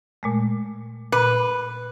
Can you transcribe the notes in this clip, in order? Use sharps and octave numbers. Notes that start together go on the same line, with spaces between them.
A#2 G#3 A3
A#2 B4